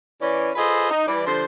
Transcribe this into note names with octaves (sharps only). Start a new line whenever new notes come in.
E3 C#4 D5
F4 G#4 A4 B4 C5 D#5
D#4
E3 G3 D5
D3 F3 G3 C5